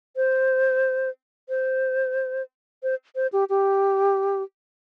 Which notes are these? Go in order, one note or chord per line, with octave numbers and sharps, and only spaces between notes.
C5
C5
C5
C5
G4
G4